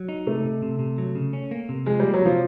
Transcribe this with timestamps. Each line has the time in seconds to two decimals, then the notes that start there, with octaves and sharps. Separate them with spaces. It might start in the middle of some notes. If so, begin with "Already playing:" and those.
Already playing: F#3
0.09 D#4
0.27 C3 A3
0.44 C3
0.62 C3
0.79 C3
0.98 F#3
1.15 C#3
1.33 C#4
1.51 A#3
1.69 C3
1.86 F3 G#3
2.00 G3 A#3
2.14 F#3
2.21 C3 F3